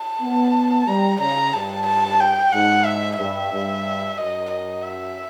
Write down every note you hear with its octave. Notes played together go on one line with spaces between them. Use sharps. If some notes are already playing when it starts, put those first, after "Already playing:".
Already playing: A5
B3
G3 A#5
C#3 A#5
G2 A5
A5
G5
G#2 F#5
E5
G2 E5
G2
F#2 D#5
D#5
E5